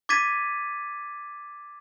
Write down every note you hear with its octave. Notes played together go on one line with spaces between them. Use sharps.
D6 G#6 A6 B6 D#7